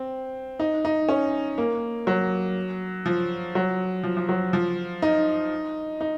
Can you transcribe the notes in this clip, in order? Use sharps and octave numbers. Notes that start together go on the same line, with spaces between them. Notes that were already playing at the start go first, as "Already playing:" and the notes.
Already playing: C4
D#4
D#4
C#4
A#3
F#3
F3
F#3
F3
F3
F#3
F3
D#4
D#4